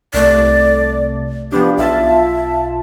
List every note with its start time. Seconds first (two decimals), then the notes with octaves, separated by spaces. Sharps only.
0.14 C2 A3 D5
1.52 F3 B3 D4 G4
1.77 B1 F4 E5 A5